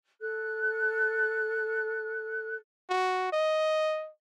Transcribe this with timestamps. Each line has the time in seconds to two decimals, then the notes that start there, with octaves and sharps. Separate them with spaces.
0.21 A4 F#6
2.89 F#4
3.32 D#5